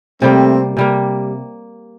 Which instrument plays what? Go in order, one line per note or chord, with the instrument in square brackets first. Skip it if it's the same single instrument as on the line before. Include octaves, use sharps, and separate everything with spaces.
[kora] C3 G3 A#3 [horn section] A3 C4
[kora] C3 G3 A#3